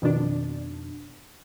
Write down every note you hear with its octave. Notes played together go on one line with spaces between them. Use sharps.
F2 B2 D#3 D4